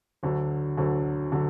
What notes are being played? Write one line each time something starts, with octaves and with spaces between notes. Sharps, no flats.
D2 D3 F#3
D2 D3 F#3
D3 F#3